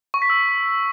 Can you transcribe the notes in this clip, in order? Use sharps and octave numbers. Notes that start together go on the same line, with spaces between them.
C#6
B6
E6